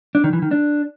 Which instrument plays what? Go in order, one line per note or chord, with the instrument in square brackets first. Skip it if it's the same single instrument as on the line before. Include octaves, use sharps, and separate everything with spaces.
[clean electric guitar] D4
D#3
E3
D#3
D4